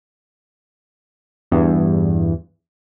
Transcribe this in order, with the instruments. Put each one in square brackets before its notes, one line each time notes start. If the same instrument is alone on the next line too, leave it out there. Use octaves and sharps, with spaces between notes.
[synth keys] E2 G2